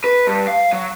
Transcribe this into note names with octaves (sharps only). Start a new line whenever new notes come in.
B4
G2
F5
F#3